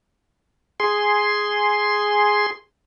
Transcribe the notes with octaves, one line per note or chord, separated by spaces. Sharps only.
G#4 C6